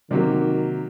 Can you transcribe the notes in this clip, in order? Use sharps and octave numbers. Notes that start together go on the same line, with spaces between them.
C3 D#3 F#3 A#3